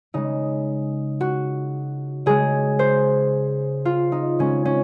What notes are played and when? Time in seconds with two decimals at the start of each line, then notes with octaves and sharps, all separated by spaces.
0.14 C#3 G#3 D#4
1.21 F#4
2.26 C#3 G#3 G#4
2.79 C5
3.85 F4
4.12 D#4
4.39 C#3 G#3 C#4
4.65 C#4